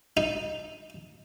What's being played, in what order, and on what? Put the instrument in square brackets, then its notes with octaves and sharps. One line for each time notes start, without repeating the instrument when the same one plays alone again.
[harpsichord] D#4